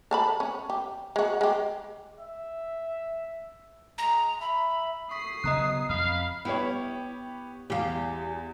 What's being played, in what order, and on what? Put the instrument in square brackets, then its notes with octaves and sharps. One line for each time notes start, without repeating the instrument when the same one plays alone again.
[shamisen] A4 A5 B5
C#4
G4
G#3 F#4
G#3 G4
[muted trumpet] E5
[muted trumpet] G#3 [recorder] A#5
[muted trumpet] E5 [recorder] B5
[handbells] C#6 B6 [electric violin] D#6 C7
[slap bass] C#3 F#3 B3 [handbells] D#5 A#5 F#6
[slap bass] F2 [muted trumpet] F5 [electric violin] B5
[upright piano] B3 G4 C#5 [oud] E4
[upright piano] E2 [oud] G4 F5